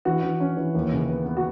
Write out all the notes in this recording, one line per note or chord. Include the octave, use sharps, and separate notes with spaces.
E3 F#4
E3
C#4
E3
D#2
C#3
B3
B3
F#4